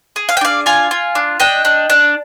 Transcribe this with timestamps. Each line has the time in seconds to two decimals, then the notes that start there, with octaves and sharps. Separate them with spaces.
0.16 G#4
0.29 F5
0.37 G5
0.41 D4 D5 F5
0.66 F4 F5 G#5
0.91 F4
1.15 D4
1.40 D4 D#5 G5
1.65 D4
1.90 D4